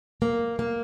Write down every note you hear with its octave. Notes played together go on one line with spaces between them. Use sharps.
A#3
A#3